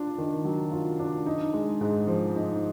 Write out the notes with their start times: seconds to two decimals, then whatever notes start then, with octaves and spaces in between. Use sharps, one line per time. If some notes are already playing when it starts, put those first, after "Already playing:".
Already playing: D4 F4
0.18 D#3
0.45 F#3
0.72 F4
0.99 D4
1.26 D#4
1.54 G#3
1.81 G#2
2.07 F3
2.35 D#4